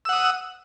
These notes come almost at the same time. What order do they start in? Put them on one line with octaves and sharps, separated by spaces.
E6 F#5 D#6